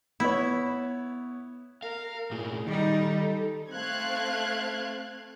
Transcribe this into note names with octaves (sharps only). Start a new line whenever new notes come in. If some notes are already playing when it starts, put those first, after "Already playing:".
B3 E4 C#5
A#4 F5
A#2 A3 G#4
D#3 G3 D#4
A4
A3 C4 F5 F#6 G#6